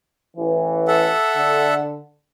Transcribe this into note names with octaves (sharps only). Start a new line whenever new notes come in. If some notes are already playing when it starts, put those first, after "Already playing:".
A1 E3
A4 E5 F#5
D3